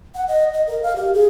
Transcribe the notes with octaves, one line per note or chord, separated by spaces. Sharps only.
F#5
D#5
D#5
A#4
F5
G4
G#4